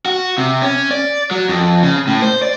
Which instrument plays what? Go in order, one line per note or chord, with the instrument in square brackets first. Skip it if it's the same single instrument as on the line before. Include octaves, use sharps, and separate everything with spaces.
[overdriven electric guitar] F#4
C3
C#4
D5
F#3
F2
C#3
A2
C5
D5